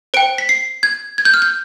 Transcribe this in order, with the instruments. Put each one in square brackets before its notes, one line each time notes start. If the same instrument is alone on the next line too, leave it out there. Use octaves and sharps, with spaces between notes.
[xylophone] C5 G5 D7
B6
C7
G#6
G#6
G6
F6
G6